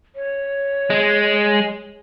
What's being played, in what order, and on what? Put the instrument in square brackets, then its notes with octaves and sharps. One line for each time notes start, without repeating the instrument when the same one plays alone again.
[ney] C#5
[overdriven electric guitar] G#3